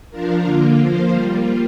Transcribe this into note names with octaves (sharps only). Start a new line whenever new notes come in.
F3 D4 F4 A#4
D3 A#3 F4
F3 A#3 F4 C5
G3 A#3 F4